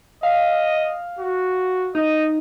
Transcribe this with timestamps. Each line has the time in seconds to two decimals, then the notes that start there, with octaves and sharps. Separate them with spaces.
0.23 D#5 F5
1.19 F#4
1.95 D#4 D#5